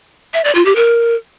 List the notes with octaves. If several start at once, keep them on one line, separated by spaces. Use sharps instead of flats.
E5
D5
F4
G4
A#4